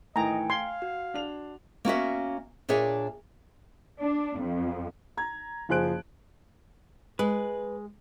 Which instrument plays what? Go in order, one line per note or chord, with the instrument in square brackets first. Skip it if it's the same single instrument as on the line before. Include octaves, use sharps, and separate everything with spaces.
[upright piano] A2 D#3 E3 [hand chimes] A3 G5 G#5 [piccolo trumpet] D#5 [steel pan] A#5
[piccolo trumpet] F5 [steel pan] C6 [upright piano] G#6 C7
[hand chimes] F#4
[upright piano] D4 F7
[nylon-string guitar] A#3 C#4 F#4 E5
A#2 D4 G#4 C#5 E5
[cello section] D4
F2
[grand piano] A#5 G#6
F#1 F3 G#4 C5 F#6 D7
[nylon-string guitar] G#3 [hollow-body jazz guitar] B4